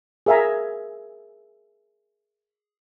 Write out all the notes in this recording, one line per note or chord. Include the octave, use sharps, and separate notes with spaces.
G#4 A#4 E5 F5 G#5 A#5